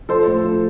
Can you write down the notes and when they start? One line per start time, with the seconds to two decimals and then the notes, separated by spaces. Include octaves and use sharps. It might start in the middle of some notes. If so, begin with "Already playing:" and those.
0.09 F3 A4 C5
0.27 A2
0.44 F3